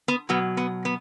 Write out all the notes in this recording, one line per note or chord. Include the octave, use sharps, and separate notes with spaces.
B3
B2 F#3 B3
B3
B3